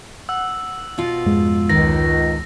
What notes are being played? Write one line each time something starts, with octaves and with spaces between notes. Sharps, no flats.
F#5 E6
B2 F4
F2 G#2 G#3
C#2 D#3 A#6